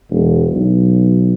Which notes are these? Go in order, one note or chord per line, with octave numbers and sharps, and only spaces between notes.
E1
B1